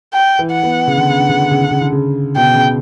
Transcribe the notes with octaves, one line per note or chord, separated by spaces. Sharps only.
G5
E3
F#5
B3
C#3
D3
C#3
D3
C#3
D3
C#3
D3
C#3
D3
C#3
B2 G5
C#3